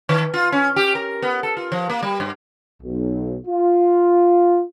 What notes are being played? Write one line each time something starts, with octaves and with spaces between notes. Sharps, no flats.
D#3
F4
C#4
G4
A#4
B3
A4
F4
F3
A#3
G3
G2
B1
F4